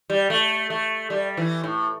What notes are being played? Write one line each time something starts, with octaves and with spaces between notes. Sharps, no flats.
G3
A3
A3
G3
E3
A2